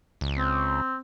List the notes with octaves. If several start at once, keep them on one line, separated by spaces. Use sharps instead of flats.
C#2
C4